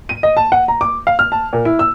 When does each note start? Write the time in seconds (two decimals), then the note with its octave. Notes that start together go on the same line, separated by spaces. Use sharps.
0.09 D#7
0.23 D#5
0.37 A5
0.52 F#5
0.68 A#5
0.81 D6
1.07 F5
1.19 F6
1.32 A5
1.53 A#2
1.65 E4
1.79 E6